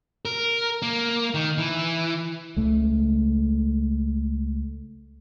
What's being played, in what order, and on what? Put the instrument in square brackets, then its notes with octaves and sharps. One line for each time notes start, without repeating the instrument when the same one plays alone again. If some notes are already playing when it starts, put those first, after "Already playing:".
[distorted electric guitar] A#4
A#3
D#3
E3
[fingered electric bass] C#2 A3